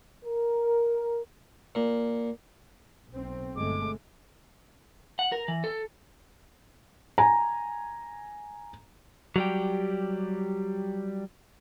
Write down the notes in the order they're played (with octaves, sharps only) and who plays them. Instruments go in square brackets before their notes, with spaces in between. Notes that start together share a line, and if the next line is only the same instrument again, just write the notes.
[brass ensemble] A#4
[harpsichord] A#2
[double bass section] B1 C4
[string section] G1 G#3 A3 [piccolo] D6
[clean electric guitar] F#5
A#4
E3
A4
[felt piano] G#5 A#5
[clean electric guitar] F#3 G3 G4